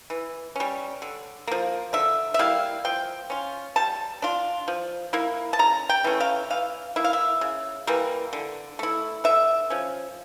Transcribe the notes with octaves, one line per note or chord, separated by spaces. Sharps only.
E3
G3 C#4
D3
F3 A#3
D3 E5
E5
G3 A#3 E4 F5
F3 G5
C#4 F4
G3 A5
D4 F4
F3
A#3 E4
A5
C#3 A#5
G5
E3 A3 C#4
F5
E3 F5
A#3 E4 E5
F5
E5
C#3
E3 G3 A#3
D3
A3 E4
D3 E5
F3 C#4